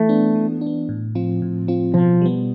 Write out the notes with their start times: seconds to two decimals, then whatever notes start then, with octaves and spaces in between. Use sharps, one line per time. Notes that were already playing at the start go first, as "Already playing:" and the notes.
Already playing: E3 A3
0.09 B3 D4
0.35 E3
0.61 D4
0.66 B3
0.89 A2
1.15 F3 C4 F4
1.42 A2
1.68 F3 C4 F4
1.94 B2 F3
2.21 G3 B3